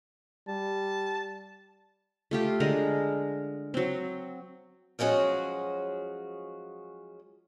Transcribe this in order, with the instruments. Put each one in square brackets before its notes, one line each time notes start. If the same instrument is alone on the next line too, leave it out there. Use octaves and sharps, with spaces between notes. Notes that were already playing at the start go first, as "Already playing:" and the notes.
[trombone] G3 [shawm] A5
[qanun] A3 F4 G4
D3 G#3 A#4
F#3 C4
[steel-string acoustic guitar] F3 F#3 G#3 C#4 F#4 G#4